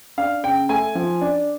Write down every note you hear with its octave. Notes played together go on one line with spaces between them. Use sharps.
D4 F5
C#3 G5
A3 G#5
F3
D4